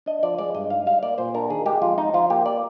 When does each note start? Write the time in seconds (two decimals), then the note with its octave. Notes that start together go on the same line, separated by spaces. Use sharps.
0.06 D4 D#5
0.23 F3 D5
0.39 G#3 D5
0.55 G2 D#5
0.70 D#4 F5
0.86 G3 F5
1.03 A#3 D5
1.18 A#2 C5
1.34 D4 A#4
1.50 D#3 G#4
1.66 G#3 G4
1.82 F2 F4
1.98 D#4
2.14 F3 F4
2.30 A#3 G4
2.46 D5